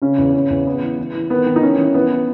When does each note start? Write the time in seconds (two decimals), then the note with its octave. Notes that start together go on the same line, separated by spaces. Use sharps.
0.02 C#3 C#4
0.18 E2
0.34 C#3 C#4
0.50 E2
0.66 E3 B3
0.82 E3
0.99 E3
1.14 E3
1.30 D#3 B3
1.46 D#3
1.56 D#4
1.63 E3 C#4
1.78 E3
1.94 E3 B3
2.10 E3